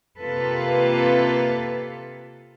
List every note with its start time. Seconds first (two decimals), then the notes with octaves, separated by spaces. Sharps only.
0.19 C3 A#3 F4 A4 B4